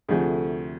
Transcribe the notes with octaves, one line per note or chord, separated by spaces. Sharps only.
D2 C3 F3 A3 G#4